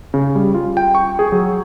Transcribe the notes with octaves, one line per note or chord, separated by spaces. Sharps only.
C#3
G3
F4
G5
C#6
G#4
F#3